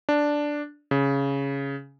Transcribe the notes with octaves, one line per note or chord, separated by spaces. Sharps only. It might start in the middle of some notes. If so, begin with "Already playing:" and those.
D4
C#3